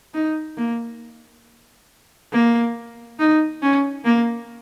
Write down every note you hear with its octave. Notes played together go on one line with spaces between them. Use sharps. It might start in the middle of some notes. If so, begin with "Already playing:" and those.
D#4
A#3
A#3
D#4
C#4
A#3